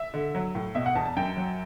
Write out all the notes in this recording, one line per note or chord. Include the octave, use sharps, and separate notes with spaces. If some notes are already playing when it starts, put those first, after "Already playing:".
Already playing: E5
D3
F#3
A2
B2 E5
F#5
E2 A5
A5
F#2 G5
F#3